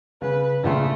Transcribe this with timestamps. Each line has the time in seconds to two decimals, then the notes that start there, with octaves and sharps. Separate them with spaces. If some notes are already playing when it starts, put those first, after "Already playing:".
0.22 C#3 B4
0.64 A#1 C#3 A3 C6